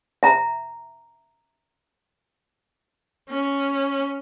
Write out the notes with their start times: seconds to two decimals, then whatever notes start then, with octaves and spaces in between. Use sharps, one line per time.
0.23 E5 A#5
3.30 C#4